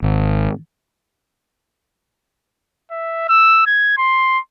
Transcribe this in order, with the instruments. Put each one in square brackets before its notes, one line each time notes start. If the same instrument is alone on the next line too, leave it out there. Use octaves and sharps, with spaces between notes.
[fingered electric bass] G#1
[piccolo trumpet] E5
E6
G#6
C6